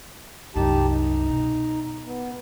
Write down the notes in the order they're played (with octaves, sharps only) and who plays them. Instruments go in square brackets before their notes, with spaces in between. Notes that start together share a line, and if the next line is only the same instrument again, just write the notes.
[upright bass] C2 F#2 [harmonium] D#4 G4 A5
[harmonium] D#4
[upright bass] B2
[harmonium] B3